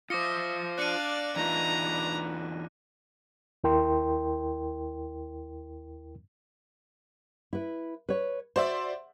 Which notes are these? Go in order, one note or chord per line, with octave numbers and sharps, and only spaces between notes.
F4 C5 D#5 E5 D6 A#6 C#7
D4 D5 F5 F#6 C#7 D#7
E2 D4 D#4 F4 B4 A#5
D#2 E4 A#4 G5 C6
E4 B4
B4 C#5
F#4 C5 D5 E5